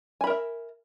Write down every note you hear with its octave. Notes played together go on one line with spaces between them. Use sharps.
A#4 E5 G#5 B5